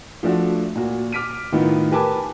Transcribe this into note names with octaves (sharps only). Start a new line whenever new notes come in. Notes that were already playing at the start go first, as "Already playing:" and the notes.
F3 A3 D4 F#4
A#2 F#4
D6 F6 B6 D7 D#7
A2 D#3 B3 D#4 F4
G4 A#4 B4 G#5 A5 D6